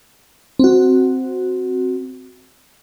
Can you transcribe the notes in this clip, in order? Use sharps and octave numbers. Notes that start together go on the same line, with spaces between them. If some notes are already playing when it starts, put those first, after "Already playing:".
C4 F#4